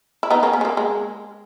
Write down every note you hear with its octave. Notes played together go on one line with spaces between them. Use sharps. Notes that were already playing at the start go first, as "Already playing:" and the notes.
E4
B3 D#4
A#3 C#4
B3
G#3
A#3
G#3